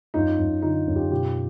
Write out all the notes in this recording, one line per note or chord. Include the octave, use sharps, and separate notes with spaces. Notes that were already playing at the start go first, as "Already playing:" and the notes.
F#2 D#4 F4
F#2
D3 D#4 F4
F#2
F4 G4
B2 F4 G4